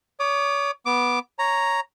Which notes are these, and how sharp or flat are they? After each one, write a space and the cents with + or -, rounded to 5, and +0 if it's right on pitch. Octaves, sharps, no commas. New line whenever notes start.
C#5 +35 D6 +40
B3 -10 D6 +0
C#5 +0 A#5 +0